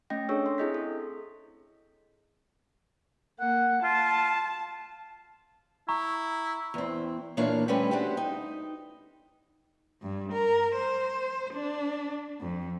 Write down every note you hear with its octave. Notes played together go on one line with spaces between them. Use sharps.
A3 C#4 D#5 G5 A#6
D4 G#4 A4 C#5 C#6 E6
C6
C4 E4 G#4 D#5 G6 B6
A4
A#3 F#5
F4 A5
E4 A#5 C#6
E2 C4
A#2 E3 A#3 D4 C#5 F5
G3 A3 C4 C#4 B4
C4 D4 F#4 G4
D#4
G2
A#4
C5
D4
F2